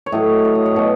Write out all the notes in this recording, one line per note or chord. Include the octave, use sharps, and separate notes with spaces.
C#5
A2 F#3 D#5
C#5
D#5
C#5
B2 F#3 C#5